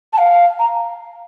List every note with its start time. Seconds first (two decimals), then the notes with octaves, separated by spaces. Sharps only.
0.13 A5
0.18 F5
0.59 A#5